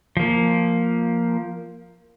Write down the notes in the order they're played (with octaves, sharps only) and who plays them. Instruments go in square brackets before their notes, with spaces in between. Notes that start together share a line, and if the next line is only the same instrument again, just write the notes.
[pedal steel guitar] F3 A#3